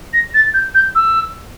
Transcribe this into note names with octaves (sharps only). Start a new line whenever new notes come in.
A#6
A6
G6
G6
E6